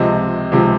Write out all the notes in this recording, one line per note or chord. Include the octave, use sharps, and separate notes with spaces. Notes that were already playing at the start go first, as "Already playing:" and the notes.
Already playing: C#2 C3 F3 C4 D#5
C#2 C3 F3 C4